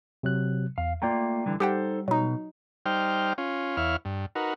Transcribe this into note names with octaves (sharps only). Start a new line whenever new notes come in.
C3 F#3 F#6
E2 F5
A3 A#3 F4 D5 G5 A#5
D3 E3 G3
G3 D#4 G4 A4 C5 F#5 G5
B2 F#3 D#4
G3 D#4 C5 G5 F6
C#4 F4
E2 E4 C#5 F5 F6
G2
D#4 F#4 A#4 B4